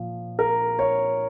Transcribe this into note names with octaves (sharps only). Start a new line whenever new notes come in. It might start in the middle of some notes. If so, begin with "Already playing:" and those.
Already playing: A#2 F3
A#4
C#5